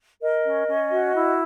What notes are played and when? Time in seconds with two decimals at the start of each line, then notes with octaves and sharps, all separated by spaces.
0.22 A#4 D#5
0.45 C#4
0.67 C#4
0.91 F#4
1.14 E4